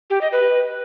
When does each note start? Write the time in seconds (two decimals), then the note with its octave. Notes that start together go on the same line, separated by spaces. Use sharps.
0.10 G4
0.21 D#5
0.32 B4